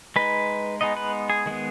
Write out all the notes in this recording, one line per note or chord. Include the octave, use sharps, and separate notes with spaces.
G#3 D#4 B4
G#3 B3 D#4 D#5
B4
G#4
D#3 G#3 B3